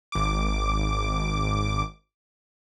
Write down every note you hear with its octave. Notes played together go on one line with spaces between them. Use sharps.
G#1 D6